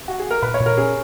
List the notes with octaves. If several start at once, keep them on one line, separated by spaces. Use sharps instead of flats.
F#4
G#4
A#4
A#2 B4
C#5
A#2
A#4
C#4 G#4